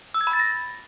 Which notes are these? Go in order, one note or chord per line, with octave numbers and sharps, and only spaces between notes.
E6
G#6
B5
A6
A#6